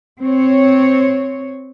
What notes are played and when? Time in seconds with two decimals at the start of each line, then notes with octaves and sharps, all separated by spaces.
0.19 C4 C#5